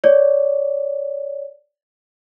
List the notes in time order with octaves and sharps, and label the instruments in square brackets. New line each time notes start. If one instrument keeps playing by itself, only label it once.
[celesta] C#5 D5